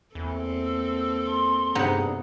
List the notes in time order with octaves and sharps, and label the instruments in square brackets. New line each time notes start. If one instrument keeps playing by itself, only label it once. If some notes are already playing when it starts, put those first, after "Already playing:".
[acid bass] E2 [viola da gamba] A#3 C4 A4
[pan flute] E6
C6
[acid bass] G2 [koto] C3 B3 D#4 [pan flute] G#4